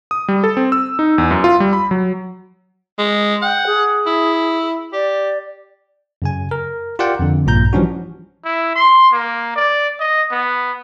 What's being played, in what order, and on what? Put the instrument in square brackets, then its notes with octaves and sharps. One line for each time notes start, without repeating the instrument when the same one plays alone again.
[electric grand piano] D#6
G3
A4
C4
E6
D#4
E2
F#2
F4
G3
B5
F#3
[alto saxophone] G#3
[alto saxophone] F#5 [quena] G5
[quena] G#4
[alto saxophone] E4
[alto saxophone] G4 [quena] D5
[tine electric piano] F#2 C#3 G#5
A#4
F4 G4 A#4 D5 F#5 G5
F2 D3
A#1 G2 A#2 A#5 G6
E3 F3 G3 C#4 D4 F#4
[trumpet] E4
C6
A#3
D5
D#5
B3